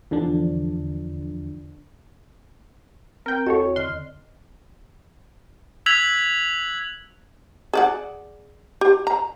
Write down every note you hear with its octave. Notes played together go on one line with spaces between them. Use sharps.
E2 D3 F3 D4
C4 A#4 G5 A#5
E2 F#4 A4 C#5 D#5
D3 D#5 C6 F6
E6 F#6 G#6 B6 F7 F#7
G#4 D5 F#5
G4
A#5